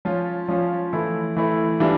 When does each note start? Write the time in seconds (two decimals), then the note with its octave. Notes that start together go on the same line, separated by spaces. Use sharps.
0.05 F3 C#4 F4
0.48 F3 C#4 F4
0.93 E3 A3 E4
1.36 E3 A3 E4
1.80 E3 G3 D4 F4